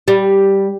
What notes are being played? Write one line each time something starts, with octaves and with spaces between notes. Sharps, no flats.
G3